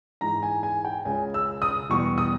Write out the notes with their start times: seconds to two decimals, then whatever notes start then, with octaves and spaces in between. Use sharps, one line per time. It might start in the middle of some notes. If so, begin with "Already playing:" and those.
0.21 G#2 E3 G#3 A#5
0.43 G#5
0.63 G#5
0.85 G5
1.05 C#2 C#3 G#3 G#5
1.34 E6
1.62 D#6
1.90 E2 B2 G3 C#6
2.18 D#6